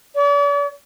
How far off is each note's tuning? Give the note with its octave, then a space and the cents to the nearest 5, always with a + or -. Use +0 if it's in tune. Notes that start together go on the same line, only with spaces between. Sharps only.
D5 -45